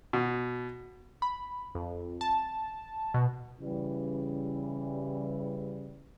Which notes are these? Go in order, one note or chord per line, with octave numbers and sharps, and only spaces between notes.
B2
B5
F2
A5
B2
C#3 E3 G3